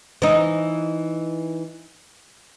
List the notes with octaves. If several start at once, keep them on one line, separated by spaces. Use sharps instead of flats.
E3 D#4